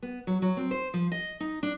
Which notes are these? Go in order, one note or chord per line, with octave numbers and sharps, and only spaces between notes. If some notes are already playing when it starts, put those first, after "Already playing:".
B3
F#3
F#3
C4
C5
F3
D#5
D#4
D4